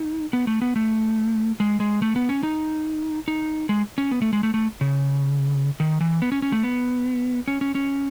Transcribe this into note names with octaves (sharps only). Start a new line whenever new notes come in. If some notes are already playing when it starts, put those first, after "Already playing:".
Already playing: D#4
B3
A3
B3
A3
G#3
G#3
A3
B3
C#4
D#4
D#4
G#3
C#4
B3
A3
G#3
A3
A3
C#3
D#3
E3
B3
C#4
C#4
A3
B3
C#4
C#4
C#4